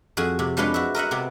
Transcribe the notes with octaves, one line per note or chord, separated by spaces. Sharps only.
F2 F#4 G#4 G#5
C3
F3 G#3 D4 F4 B4 C#5
F#4 E5
A#4 D#5 E5 F#5
C3 B3 C4